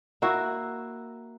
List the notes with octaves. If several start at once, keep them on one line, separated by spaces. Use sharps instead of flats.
A#3 E4 F#4